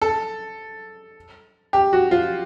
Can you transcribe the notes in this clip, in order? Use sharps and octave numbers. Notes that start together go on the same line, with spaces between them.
A4
G4
F#4
F4